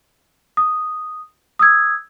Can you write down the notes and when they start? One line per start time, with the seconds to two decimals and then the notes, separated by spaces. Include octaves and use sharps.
0.57 D#6
1.59 D#6 E6 G#6